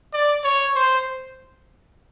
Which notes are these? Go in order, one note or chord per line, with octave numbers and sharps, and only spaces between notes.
D5
C#5
C5